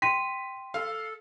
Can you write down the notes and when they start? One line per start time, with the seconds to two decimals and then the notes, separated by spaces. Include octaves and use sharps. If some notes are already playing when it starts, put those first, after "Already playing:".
0.02 G5 C6 B6 D#7
0.74 A4 F5